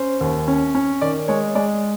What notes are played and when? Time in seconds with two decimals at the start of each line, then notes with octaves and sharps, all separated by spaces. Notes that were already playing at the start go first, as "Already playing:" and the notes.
Already playing: C#4 C5
0.21 D#2
0.48 C#4
0.75 C#4
1.02 D#3 D5
1.28 G#3 C#5
1.55 G#3 D5